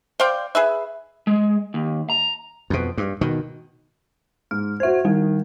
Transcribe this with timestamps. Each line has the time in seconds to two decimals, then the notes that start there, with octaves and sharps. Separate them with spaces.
0.20 C5 D5 F5 G5
0.55 G#4 B4 E5
1.27 G#3
1.74 D#2
2.10 A#5
2.70 F2 B2
2.98 G2
3.21 B2 D#3
4.51 G#2 F6
4.80 F#4 C5 E5 G#6
5.05 D#3 G3